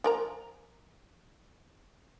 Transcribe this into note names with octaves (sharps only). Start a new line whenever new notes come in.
F3 A#4 A#5